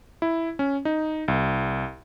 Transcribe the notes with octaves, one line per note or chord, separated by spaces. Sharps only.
E4
C#4
D#4
C2